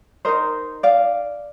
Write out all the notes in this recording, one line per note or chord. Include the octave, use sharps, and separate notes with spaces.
D#4 A#4 C5 D#5
D5 F5